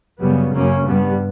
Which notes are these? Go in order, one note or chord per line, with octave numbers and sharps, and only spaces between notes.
F#2 C#3 G3 B3
F#2 C#3 A#3 C#4
G2 G3 B3